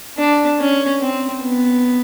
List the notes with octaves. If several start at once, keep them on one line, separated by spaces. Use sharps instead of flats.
D4
C#4
C4
B3